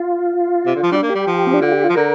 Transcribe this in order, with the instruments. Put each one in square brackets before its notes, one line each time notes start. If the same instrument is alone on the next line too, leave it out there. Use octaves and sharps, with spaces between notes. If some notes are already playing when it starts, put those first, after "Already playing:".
Already playing: [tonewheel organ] F4
[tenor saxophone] C3
D3
F3
[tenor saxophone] G3 [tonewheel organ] D4
[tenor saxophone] A#3
[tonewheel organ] G4
[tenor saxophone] G3
F3
[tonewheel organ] C4
D4
[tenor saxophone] D3 [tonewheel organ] F4
[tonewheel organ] G4
F4
[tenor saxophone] F3
[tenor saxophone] D3 [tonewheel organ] A#4